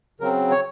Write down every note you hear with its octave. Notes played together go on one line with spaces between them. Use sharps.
C#3 F#3 C4 A#4
C#5